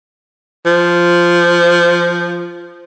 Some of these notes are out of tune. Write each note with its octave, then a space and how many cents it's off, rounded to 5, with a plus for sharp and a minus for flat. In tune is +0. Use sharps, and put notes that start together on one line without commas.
F3 -10